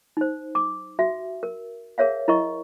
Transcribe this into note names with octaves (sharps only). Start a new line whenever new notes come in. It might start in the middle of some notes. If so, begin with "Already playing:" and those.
D#4 C5
D6
F#4 E5
A#4
G#4 A#4 C#5 E5 F5
E4 A#4 D#5 C#6